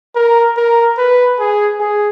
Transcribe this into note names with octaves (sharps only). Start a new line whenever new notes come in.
A#4
A#4
B4
G#4
G#4